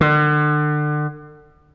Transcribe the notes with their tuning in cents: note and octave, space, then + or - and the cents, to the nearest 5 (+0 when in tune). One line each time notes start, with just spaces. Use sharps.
D3 +35